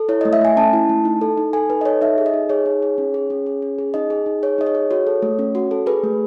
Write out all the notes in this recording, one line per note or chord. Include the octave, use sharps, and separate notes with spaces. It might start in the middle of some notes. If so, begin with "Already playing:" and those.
Already playing: A4
E4 C#5
A3 D#5
E5
A3 G#5
C#4 A5
E4
A3
D#4
A4
D#4
A4 G#5
D#4 B4
D#5
A4 C#5
D#4 E5
G#4
D#5
D#4
G#4 C#5
D#4
G#4
C#4
G#4
C#4
G#4
C#4
G#4
D#4 D#5
G#4
D#4
G#4 C#5
D#4 D#5
C#5
G#4
F#4 C#5
A4
A3
C#4
F#4
A4
G#4 B4
A3